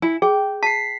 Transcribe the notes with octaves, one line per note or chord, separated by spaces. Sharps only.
E4 G#5
G#4 G5
A5 B6 C7